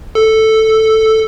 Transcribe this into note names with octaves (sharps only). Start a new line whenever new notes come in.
A4